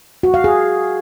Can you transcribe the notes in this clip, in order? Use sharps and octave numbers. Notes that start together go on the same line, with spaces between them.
F#4
F5
G#4